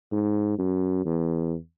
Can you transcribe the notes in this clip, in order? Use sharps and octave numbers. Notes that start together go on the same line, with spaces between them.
G#2
F#2
E2